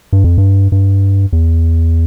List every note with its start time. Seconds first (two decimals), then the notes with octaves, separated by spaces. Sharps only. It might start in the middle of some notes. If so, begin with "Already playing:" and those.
0.13 G2
0.24 F2
0.38 G2
0.72 G2
1.33 E2